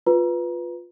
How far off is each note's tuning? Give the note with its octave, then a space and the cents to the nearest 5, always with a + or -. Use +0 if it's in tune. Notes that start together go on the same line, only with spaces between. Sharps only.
F4 +10 B4 +0 A#5 +30